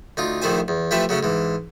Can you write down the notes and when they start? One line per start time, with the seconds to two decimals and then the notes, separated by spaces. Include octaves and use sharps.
0.17 D2 D#4 F4
0.42 A#1 D#3 A3 E4 C5 G#5
0.68 E2
0.91 F3 A3 E4 G4 B4 E5
1.09 C#3 F#3 A3 C#4
1.23 G#2 E3